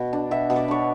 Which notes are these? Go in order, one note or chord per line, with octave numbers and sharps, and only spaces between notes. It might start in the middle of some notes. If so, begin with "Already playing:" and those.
Already playing: B2
D4
B2 E5
B2
D5
D4 C#5